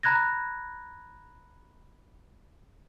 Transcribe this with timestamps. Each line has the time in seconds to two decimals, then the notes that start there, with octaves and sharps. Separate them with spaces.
0.03 A#5 B5 F#6 G#6 A#6